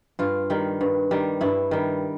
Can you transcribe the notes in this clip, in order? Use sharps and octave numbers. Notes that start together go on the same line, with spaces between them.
G2 F4
D#3 G3
G2
D#3 G3
G2 E4
D#3 G3